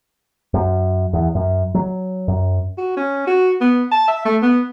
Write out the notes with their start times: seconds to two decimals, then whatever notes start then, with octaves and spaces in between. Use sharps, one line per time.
0.54 F#2
1.13 E2
1.35 F#2
1.74 F#3
2.28 F#2
2.78 F#4
2.97 C#4
3.27 F#4
3.61 B3
3.91 A5
4.08 E5
4.25 A3
4.42 B3